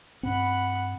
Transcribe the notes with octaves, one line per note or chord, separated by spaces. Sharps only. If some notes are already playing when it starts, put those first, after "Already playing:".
G2 A#2 C4 F#5 B5